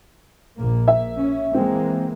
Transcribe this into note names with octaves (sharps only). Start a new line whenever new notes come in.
A#1 A#3
E5
C#4
E3 G#3 A#3 C4